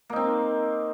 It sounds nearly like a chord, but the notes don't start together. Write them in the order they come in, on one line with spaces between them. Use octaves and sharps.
A#3 D#4 C4